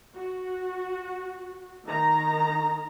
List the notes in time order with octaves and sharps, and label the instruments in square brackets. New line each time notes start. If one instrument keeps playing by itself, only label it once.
[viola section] F#4
D#3 A#5